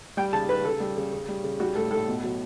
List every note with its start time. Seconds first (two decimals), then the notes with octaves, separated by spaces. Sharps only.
0.17 G3 G5
0.33 C#3 A5
0.49 C#3 B4
0.64 C#3 A4
0.80 G3
0.97 C#3
1.13 C#3
1.28 G3
1.44 C#3
1.60 G3 F#4
1.75 A2 A4
1.91 A2 A4
2.08 B2
2.24 F#3